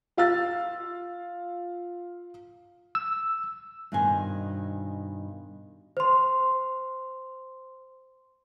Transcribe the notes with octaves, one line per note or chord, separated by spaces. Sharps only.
F4 F5 E6 A6
E6
G2 B2 D#3 C5 G#5
C5 C6